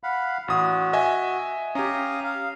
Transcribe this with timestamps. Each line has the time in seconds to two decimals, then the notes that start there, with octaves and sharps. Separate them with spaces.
0.03 F5 F#5 B5
0.48 A1 F#4 D#6
0.93 D#5 E5 G#5
1.75 C#4 G4 F5 A#5 D#6
2.24 F5